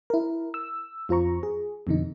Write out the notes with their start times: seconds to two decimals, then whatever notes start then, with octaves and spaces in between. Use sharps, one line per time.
0.10 E4 A#4
0.54 E6
1.09 F2 F4 C5 A#5 C#6
1.43 G#4
1.87 F2 B2 D3 D#4